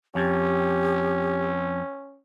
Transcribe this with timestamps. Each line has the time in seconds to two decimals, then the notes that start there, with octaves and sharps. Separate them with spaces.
0.15 F2 C#4 G4